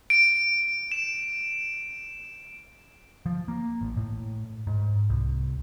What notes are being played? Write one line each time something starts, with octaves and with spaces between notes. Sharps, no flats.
D7
E7
F3
A#3
A1
A2
G#2
C2